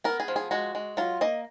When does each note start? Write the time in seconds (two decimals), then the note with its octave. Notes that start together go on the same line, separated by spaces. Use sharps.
0.04 B3 A#4
0.20 G#4
0.28 F3
0.36 G#4
0.51 G#3 F#4
0.75 G#3
0.97 F#3 F4
1.21 A#3 D#5